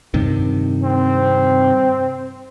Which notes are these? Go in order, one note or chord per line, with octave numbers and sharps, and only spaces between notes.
G2 C3 D#3
C4